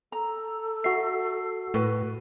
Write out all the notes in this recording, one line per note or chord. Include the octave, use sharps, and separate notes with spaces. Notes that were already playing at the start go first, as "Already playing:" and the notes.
A4 A#5
F#4 E5 C7
A2 F#4 B4